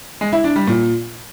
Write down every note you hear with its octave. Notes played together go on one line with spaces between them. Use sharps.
G#3
E4
D4
G3
A#2